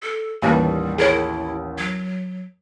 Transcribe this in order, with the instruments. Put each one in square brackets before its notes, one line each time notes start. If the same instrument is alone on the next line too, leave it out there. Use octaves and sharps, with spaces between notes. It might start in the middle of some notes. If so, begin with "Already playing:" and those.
[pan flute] A4
[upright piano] A1 D#2 [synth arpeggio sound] E3 A#3 B4 [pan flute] G3
[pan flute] E4 [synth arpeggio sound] G#4 A#4 C#5
[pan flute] F#3